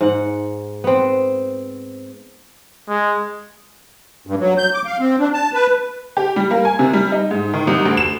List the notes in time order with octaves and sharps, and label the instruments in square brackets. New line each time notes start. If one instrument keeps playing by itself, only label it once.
[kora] G#2 F#5
B3 C4
[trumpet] G#3
[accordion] G2
F#3
G6
D6
F5
C4
D4
A5
B4
[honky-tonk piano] G4
G3
A#3
G#5
C3
G3
D#4
G#2
D#3
C2
D2
E7